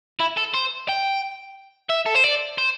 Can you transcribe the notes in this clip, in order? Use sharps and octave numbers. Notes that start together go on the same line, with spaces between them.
E4
A4
C5
G5
E5
A4
C5
D5
C5